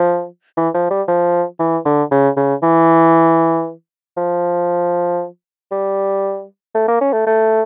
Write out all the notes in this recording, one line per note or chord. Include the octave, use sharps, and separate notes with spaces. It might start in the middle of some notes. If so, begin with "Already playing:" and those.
Already playing: F3
E3
F3
G3
F3
E3
D3
C#3
C#3
E3
F3
G3
A3
A#3
C#4
A3
A3